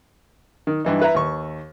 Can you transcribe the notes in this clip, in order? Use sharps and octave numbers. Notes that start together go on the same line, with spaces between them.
D#3
G2 E3 D#4
E4 B4 E5 A#5
D#2 C#6